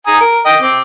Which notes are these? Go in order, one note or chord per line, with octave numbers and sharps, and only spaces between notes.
G#5 A#5 D#6
A#4
D#5 G5
C4 D6